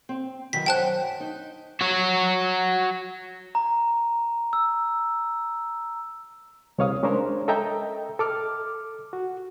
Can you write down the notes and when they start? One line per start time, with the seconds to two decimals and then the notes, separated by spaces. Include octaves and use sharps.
0.09 C4
0.53 D#3 E3 F#3 B6
0.66 F#2 C5 F#5 G5 A5 F#6
1.20 D#4
1.81 F#4 C#5
3.55 A#5
4.53 E6
6.78 C2 C3 C#5 F5 D#6
7.03 G#3 C#4 D4 A#4 C5 C#5
7.48 A4 D#5 E5 G5 A#5 G6
8.19 A4 D6 F6
9.13 F#4